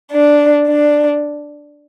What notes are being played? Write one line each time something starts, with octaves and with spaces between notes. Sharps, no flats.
D4
D4